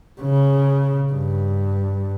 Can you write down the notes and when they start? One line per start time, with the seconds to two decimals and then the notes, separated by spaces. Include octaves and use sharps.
0.21 C#3
1.12 G2